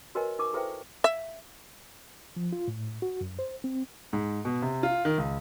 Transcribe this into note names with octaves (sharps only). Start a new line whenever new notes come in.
F#4 A#4 B4 C#5 D#5 G#5
D#4 A#4 C#6 D6
E4 A4 B4 C5 E5 G5
E5
F3
F4
A2
F#4
F#2
C5
C4
G#2
B2
C3
F4
D#3
C#2